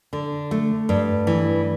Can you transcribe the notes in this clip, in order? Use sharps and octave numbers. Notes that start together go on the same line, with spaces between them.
D3
A3
G2
E3